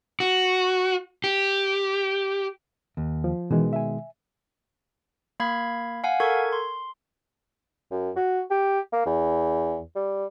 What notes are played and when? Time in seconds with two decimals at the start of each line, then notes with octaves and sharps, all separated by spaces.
0.20 F#4
1.24 G4
2.97 D#2
3.24 F3
3.51 B2 D#3 E3 G#3
3.73 E5 G#5
5.40 A#3 F5 B5 G#6
6.04 F5 F#5 G#5
6.20 A4 A#4 C#6 G#6
6.53 C6
7.91 F#2
8.16 F#4
8.50 G4
8.93 A#3
9.06 E2
9.96 G3